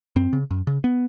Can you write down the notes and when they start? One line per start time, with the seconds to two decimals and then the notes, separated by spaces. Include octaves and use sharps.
0.16 F#2 C4
0.33 C#3
0.51 F#2
0.67 C#3
0.84 B3